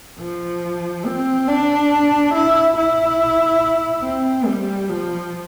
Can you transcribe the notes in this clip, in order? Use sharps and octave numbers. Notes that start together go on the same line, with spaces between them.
F3
C4
D4
E4
E4
C4
G3
F3